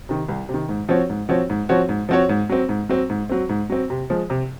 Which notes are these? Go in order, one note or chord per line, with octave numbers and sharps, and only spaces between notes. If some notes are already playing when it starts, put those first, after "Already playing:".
C3 D#3
C2
C3
D#3
G#2
F3 C4 F#4 C#5
G#2
F3 C4 F#4 C#5
G#2
F3 C4 F#4 C#5
G#2
F3 C4 F#4 C#5
G#2
F#3 C4
G#2
F#3 C4
G#2
F#3 C4
G#2
F#3 C4
C3
F3 G#3
C3